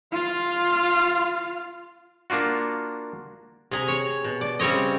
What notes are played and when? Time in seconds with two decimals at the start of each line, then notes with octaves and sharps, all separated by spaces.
0.12 F4 F5
2.30 A#3 D4 F4 F#4
3.71 C3 G#4 A#5
3.88 C#5
4.24 B2
4.41 D5
4.59 C#3 G3 C4 C#5 D#5